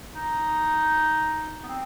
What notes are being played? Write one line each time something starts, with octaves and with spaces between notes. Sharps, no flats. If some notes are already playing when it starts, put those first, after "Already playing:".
D#4
B3
C4